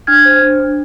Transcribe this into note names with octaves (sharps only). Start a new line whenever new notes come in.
D4 F6 G#6
C5
D4
D4